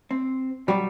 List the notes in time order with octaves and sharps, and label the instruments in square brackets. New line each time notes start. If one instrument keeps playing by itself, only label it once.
[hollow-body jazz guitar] C4
[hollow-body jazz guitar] B2 F#3 F#4 [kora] G3